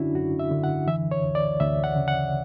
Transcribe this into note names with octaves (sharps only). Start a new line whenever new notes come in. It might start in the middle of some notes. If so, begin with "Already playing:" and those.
Already playing: F#2 D3 C#4 D4 E4 F#4
F#2 F#4
E5
D3
F#5
E3 E5
C#5
D2
D5
D2 E5
F#5
C#3
F#5